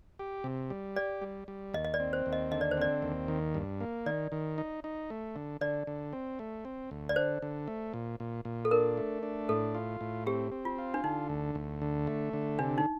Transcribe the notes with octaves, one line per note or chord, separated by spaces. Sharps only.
G4
C3
G3
G4 D5
G3
G3
D#2 D#5
D#5
D5
C4
C5
D#2
D#5
D3 D#5
D5
C5
C4 D5
D#2
D#3
G2
A#3
D#3 D5
D#3
D#4
D#4
A3
D3
D3 D5
D3
C4
A3
C4
D2
D5
D3 C5
D3
A3
A#2
A#2
A#2
A4
D4 A#4
A3
D4
A2 A4
F4
A2
C4 G4
C4
F4
F4
D4
D3 D#4
D2
D2
D3
A3
D3
C3 D4
D#4